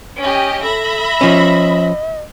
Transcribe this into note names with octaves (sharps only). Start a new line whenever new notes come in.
C#4 G4 D#5
A4 E5 B5 A#6
F3 C#4 D#5